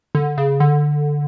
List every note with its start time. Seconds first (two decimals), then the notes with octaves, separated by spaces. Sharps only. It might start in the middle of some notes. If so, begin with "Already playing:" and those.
0.15 D3
0.38 C#3
0.60 D3